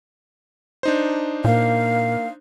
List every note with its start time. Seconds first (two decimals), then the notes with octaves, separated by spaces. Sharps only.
0.83 D4 D#4 C5
1.45 A#2 A#3 F5